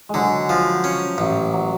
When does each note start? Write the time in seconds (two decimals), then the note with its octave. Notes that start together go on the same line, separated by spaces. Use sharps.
0.09 D3 F#3 G#3
0.49 F3
0.84 C#4
1.18 A1
1.54 F#3